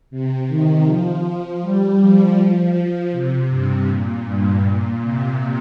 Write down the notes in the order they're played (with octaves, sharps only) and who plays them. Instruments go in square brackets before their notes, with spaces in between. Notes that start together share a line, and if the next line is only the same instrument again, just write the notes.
[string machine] C3
D#3
F3
G3
F3
C3
G2
A#2
G2
A#2
C3